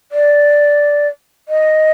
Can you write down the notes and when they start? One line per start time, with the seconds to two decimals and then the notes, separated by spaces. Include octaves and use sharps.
0.12 D5
1.48 D#5